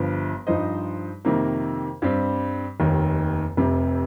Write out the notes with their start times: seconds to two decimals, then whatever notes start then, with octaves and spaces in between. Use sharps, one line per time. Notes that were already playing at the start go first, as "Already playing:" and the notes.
Already playing: G1 G2 F3
0.47 G2 F3 D#4 C5 D#5
1.25 F2 C3 D#3 A#3
2.02 G2 G3 C4
2.80 F1 D#2 D#3
3.57 F1 F2 C3